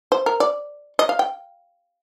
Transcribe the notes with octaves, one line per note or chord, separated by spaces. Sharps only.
C5
A#4
D5
D#5
F5
G5